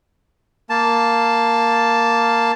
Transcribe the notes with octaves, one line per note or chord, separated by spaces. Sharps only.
A#3 A5